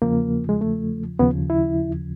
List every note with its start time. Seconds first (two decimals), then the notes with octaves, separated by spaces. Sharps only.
0.02 E2 C#3 F3 A#3
0.49 G#3
0.61 A3
1.19 D#2 C#3 F3 B3
1.50 E4